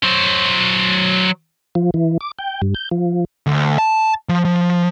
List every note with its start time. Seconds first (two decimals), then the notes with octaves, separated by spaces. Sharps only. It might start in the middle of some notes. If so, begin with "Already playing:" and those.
0.03 F#3 C5
1.75 F3
1.94 E3
2.21 D6
2.39 G5
2.62 G2
2.75 G6
2.91 F3
3.46 D2
3.78 A5
4.29 F3
4.45 F3